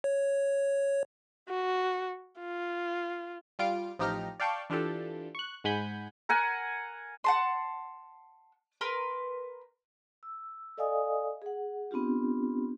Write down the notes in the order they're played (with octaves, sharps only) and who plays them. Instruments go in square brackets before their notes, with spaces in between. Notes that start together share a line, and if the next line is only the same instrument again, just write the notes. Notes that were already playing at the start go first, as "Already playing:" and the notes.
[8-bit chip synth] C#5
[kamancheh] F#4
F4
[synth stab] G3 F4 F5 D7
A1 F3 D#4 G4 A#5 F6
D5 F5 G5 A5 C#6 G6
E3 D4 F4 G4 A4
C#6 F#6
G#2 G#3 F#5 G#5 B5 G6
[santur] A#4 F#5 G#5
[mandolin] F#5 A5 C6
A#4 B4 C6
[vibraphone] E6
A4 D5 D#5 F5 G#5 D#6
G#4 F#5
B3 C4 D4 F4 G4